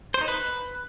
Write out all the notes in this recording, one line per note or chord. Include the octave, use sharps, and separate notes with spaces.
C5
D#4
B4